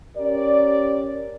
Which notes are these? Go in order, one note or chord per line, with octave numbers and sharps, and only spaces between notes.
C#4 G4 A#4 D5